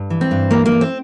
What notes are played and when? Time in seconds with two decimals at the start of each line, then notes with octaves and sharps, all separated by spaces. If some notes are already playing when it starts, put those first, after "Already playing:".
Already playing: G2
0.10 E3
0.21 C4
0.31 G2
0.51 E3 A#3
0.66 A#3
0.72 E3
0.81 C4